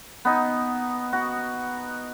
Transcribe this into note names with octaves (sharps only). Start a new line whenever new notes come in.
B3 D#4
F#4